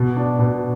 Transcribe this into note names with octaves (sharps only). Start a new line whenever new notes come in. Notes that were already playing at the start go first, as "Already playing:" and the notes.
Already playing: B2
D4
B2